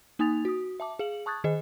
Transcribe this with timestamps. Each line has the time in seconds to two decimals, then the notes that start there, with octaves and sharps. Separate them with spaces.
0.19 A#3 D#4 G#5 D#6 A6 F7
0.45 F#4 D#6
0.80 E5 A5 D6
0.99 G#4 F5 F#7
1.26 A5 C#6 D#6 F#6 G#6 A6
1.44 D#3 G#4 D#5